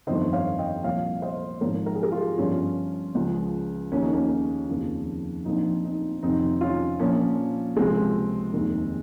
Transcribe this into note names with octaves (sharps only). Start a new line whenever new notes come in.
G1 F2 D#3 C5 D#5
C#5 F5
D#5 G5
C2 A#2 F3 C#5 F5
C5 D#5
G#1 G#2 F3 A#4 C#5
A#4
G#4
G4 A#4
F4 G#4
G1 G2 F3 C#4 F4
C#2 C#3 F3
D#2 C#3 F3 C#4
D#4
A#3 C#4
F1 D#2 C#3 F3
A#1 A#2 F3 C4 D#4
C4 D#4
F1 F2 C3 D#3 C4 D#4
C#4 F4
A#1 A#2 F3 A#3 C#4
C#2 C3 F3 G#3 C4
F1 D#2 D#3